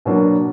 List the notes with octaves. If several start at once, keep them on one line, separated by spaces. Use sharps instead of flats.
B2 F#3 A#3 D4